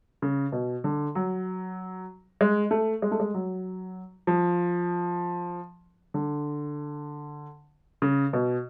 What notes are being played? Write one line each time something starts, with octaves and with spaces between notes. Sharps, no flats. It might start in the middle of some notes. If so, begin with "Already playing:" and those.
C#3
B2
D3
F#3
G#3
A3
G#3
A3
G#3
F#3
F3
D3
C#3
B2